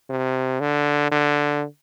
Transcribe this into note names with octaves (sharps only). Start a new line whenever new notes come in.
C3
D3
D3